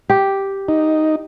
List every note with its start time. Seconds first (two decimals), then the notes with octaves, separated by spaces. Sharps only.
0.10 G4
0.68 D#4